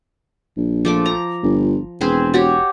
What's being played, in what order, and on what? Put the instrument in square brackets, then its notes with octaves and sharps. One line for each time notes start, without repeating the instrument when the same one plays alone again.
[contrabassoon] A#1
[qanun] F3 A3 D6
A#5
[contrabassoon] G1
[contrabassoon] E1 [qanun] C4 G#4 B4
[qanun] F#4 G4 C#5